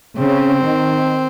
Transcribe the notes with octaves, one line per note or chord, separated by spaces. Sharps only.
C#3 C4
D#3